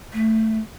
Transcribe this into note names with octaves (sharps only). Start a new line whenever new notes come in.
A3